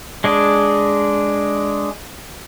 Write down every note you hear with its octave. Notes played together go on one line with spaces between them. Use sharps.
G#3 D4 G#4